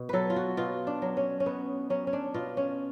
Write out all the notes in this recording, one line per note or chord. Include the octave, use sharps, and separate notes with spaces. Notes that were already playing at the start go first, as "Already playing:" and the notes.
Already playing: B2
F#3 A4 B4
F4
F#4
B2 F4
D4
F#3
C#4
C#4
B2 B3
F#3 C#4
C#4
D4
B2 F4
C#4